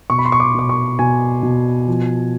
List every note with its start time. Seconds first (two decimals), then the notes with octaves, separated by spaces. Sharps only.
0.10 B2 C#6
0.18 B5
0.25 C6
0.32 C#6
0.40 D6
0.54 B2 D6
0.69 C#6
0.99 B2 G#5
1.43 B2
1.87 F3